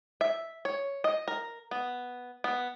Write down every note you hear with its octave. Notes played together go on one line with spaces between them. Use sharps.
E5
C#5
D#5
A#4
B3
B3